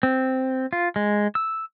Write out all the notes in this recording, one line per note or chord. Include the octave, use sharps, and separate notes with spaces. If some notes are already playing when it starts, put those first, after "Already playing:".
C4
F4
G#3
E6